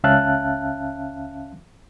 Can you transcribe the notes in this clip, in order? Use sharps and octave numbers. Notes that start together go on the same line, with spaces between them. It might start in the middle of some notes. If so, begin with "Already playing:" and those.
C#2 C#4 E5 F5 A5 F#6